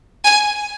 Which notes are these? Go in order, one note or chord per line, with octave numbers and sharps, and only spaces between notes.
G#5